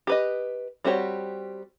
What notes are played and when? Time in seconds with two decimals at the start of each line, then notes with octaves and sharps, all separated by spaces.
0.07 G4 B4 D#5
0.84 G3 C4 F#4 G4 C#5